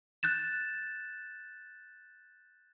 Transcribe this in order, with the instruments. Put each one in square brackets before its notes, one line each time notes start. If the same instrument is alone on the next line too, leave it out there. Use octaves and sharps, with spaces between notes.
[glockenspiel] F#6 G6 A6 E7